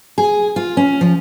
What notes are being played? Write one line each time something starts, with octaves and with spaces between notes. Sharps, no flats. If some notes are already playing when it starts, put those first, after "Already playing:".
G#4
F4
C#4
F3